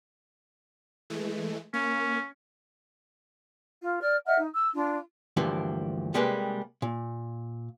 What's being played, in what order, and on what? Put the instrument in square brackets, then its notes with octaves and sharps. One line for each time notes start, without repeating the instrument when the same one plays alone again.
[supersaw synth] E3 G#3 A3
[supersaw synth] A#3 [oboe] C#4
[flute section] F4
D5 F6
D#5 E5 F#5 F6
D#4
E6
D4 F4
[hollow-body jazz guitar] D2 G2 E3 F3 A#3
C3 G3 G#3 A#3 G#4 B4
A#2